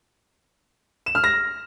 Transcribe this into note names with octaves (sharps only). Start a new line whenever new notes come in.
E7
F6
A#6